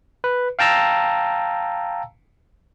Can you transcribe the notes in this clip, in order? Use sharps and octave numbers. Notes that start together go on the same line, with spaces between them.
B4
F5 G5 A5 A#5 E6